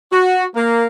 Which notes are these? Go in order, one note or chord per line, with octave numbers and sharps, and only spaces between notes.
F#4
A#3